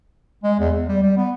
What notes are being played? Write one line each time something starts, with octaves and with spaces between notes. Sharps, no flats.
G#3
E2
E2
G3
G3
B3